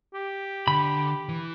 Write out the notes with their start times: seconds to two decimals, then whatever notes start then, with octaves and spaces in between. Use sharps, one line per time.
0.14 G4
0.68 D3 B5
1.29 E3